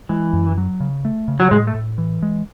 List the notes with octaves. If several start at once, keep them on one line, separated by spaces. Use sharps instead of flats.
E3 G#3
F#2
F#3
C#3
A3
C#3
F#3
A2 G#3
A3
A2
E3
G#3